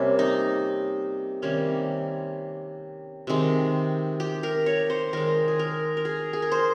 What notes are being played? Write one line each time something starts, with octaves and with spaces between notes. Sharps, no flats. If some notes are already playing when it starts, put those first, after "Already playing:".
Already playing: C3 G3 A#3 C#4
D#4
C3 D#3 G3 A#3 C#4
C3 D#3 G#3
G4
A#4
C#5
C5
D#3 G#3 A#4
G#4
A#4
A#4
G#4
G#4
A#4
C5